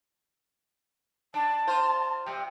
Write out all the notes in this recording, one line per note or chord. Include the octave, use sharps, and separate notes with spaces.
D4 A5
F4 C5
C3 G3